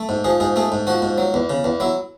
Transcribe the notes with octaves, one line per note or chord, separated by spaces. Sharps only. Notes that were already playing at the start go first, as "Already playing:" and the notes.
Already playing: A3
G#2
F3 G#4
G#2 G#4
A3 G#4
G#2
F3 F#4
G#2
F#3
E2
C#3
E2
F#3 E4